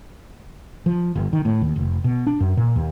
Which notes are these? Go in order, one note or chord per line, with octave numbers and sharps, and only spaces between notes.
F3
G1
D#3
A2
D#2
F1
B2
D4
F#2
A#2
D#2